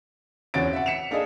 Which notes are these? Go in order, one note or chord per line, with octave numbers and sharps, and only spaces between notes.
E2 C4 C#4 F#4 A6 D7
E5 F#5
B6 C#7 E7 F7
A#3 D4 G#4 A4 D#5